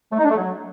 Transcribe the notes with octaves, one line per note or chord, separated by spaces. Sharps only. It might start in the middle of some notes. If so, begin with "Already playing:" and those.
A3
D#4
D4
A3
F#3